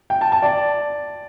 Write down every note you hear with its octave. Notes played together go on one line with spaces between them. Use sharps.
G5
A5
A5
D5